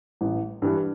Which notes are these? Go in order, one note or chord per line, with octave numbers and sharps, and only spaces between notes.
A1
G2 E3